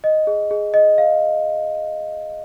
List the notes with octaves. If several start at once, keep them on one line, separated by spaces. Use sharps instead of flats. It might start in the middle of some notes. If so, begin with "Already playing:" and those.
D#5
G#4
G#4
D#5
F5